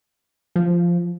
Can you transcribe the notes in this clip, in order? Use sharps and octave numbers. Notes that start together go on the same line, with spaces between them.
F3